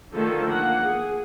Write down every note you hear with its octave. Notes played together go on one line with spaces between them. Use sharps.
D3 D#3 F3 A3 A4
A#3 F#5
G#4